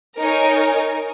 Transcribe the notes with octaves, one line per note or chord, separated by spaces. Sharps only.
D#4 A#4 C#5 G#5